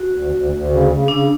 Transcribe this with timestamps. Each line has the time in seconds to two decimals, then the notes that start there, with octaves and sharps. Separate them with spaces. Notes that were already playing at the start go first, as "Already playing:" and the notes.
Already playing: F#4
0.12 D2
0.31 D2
0.51 D2
0.70 C#3
0.88 C#3
1.08 C#3 D4